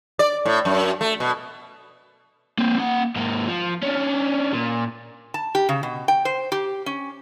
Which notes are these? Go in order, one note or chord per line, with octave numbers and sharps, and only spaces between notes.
D5
A2
F#2
A3
B2
A#3 C4
A#3 F#5
G#2 A#3
F3
C#4 D4
A#2
A5
G4
C#3
B2
G5
C5
G4
C#4